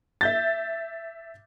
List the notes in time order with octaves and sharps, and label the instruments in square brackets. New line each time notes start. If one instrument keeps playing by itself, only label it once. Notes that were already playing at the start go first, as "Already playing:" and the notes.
[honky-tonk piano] E5 G6 A6